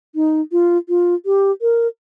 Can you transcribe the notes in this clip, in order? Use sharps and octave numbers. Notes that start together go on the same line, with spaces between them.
D#4
F4
F4
G4
A#4